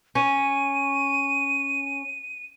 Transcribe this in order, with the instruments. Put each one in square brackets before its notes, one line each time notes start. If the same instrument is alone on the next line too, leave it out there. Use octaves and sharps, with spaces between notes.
[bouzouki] C#4 [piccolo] D#7